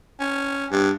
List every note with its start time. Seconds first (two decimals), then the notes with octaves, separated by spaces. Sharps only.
0.20 C#4
0.71 G2